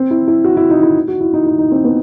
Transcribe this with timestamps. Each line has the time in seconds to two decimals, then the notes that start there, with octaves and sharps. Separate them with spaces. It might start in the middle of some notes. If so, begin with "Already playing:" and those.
Already playing: C4
0.11 E4
0.28 E4
0.44 F#4
0.57 E4
0.70 D#4
0.83 E4
1.08 F#4
1.21 E4
1.33 D#4
1.46 D#4
1.59 D#4
1.71 C4
1.84 B3